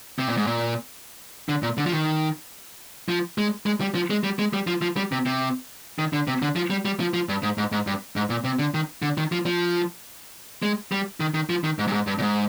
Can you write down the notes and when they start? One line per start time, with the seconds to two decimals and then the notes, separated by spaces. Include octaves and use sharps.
0.19 C3
0.28 A#2
0.37 G#2
0.47 A#2
1.49 D3
1.63 A#2
1.78 D3
1.86 F3
1.92 D#3
3.09 F3
3.38 G#3
3.66 G#3
3.81 G3
3.95 F3
4.10 G#3
4.24 G3
4.39 G#3
4.53 G3
4.67 F3
4.82 F3
4.96 G3
5.12 C3
5.26 C3
5.99 D#3
6.13 D3
6.28 C3
6.42 D3
6.56 F3
6.70 G3
6.85 G3
7.00 F3
7.14 F3
7.29 G2
7.43 G#2
7.58 G#2
7.72 G#2
7.87 G2
8.16 G#2
8.30 A#2
8.44 C3
8.59 D3
8.74 D#3
9.02 D3
9.17 D#3
9.32 F3
9.46 F3
10.63 G#3
10.92 G3
11.20 D#3
11.34 D#3
11.50 F3
11.64 D#3
11.79 G#2
11.87 G2
11.93 G#2
12.07 G2
12.18 A#2
12.22 G#2